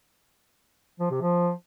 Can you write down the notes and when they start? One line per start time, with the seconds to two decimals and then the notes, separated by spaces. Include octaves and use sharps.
1.00 F3
1.10 C3
1.21 F3